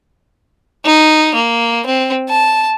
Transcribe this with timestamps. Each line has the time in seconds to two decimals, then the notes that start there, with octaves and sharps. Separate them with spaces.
0.85 D#4
1.35 A#3
1.86 C4
2.29 A5